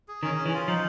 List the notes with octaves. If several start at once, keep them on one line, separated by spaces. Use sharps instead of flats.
G#4
D#3 C#4
C#4
E3
F4
F3 D#4